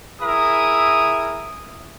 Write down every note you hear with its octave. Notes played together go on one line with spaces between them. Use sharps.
E4 G#4 A#4 E5 D#6